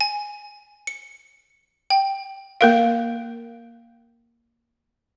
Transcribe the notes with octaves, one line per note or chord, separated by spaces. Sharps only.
G#5
C#7
G5
A#3 A#4 F5